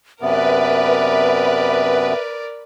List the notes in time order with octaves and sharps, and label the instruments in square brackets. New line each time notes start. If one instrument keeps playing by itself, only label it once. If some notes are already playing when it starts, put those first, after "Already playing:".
[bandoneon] F#2 C3 B3 [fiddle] A#4 D5 [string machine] B4 [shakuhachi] E5